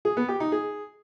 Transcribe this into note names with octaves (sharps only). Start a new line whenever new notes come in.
G#4
B3
G4
D#4
G#4